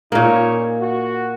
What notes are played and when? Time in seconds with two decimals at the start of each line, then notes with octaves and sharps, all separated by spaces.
0.12 A#2 A#3 C#4 D#4 C#5
0.80 F#4